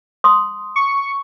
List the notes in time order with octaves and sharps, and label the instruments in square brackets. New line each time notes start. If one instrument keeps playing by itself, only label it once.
[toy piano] C6 D#6
[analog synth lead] C#6